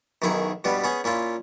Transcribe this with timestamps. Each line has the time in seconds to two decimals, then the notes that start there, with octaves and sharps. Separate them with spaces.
0.22 B1 F#2 D#3 E4 G#4 C#6
0.64 G2 B2 G3 B3
0.84 B3 C#4 G#4
1.04 A#2 C#4 E4 F4